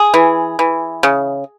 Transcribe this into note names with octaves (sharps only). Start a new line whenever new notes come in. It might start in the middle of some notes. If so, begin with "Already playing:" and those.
Already playing: G#4
E3
E3
C#3